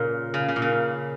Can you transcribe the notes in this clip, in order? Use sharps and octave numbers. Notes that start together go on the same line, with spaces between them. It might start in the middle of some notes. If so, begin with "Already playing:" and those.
Already playing: A#2 C#3
C#3
C#3
A#2
C#3